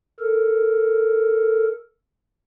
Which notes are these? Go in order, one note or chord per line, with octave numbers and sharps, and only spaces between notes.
A4 A#4